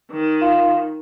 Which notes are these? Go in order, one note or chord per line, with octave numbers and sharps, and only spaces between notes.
D#3
F4